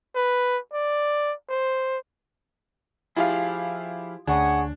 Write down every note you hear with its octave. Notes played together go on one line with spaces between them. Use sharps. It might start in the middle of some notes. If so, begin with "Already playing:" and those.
B4
D5
C5
F3 E4 F4 G4 G#4 F5
D2 D4 G#4 C#5 F#5 D#6